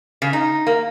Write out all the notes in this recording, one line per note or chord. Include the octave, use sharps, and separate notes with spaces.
C#3
D#4
A#3